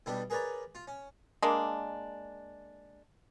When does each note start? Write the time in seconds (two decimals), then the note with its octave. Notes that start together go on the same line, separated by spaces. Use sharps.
0.06 B1 G3 B3 D4 G4
0.30 G#4 A#4 B4 C#5 D5 A#5
0.75 F4
0.88 C#4
1.42 G#3 A#3 D4